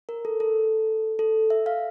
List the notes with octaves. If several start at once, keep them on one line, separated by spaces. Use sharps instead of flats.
A#4
A4
A4
A4
E5
F5